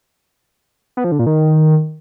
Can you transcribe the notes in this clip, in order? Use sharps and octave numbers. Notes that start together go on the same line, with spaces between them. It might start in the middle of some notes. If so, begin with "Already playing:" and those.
B3
F3
D3
A#2
D#3